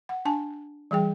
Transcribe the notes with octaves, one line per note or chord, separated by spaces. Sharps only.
F#5
D4 G#5 A5
E3 G3 G#4 G5